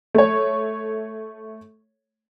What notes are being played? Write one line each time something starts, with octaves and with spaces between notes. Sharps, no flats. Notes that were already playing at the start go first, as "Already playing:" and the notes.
A3 C#5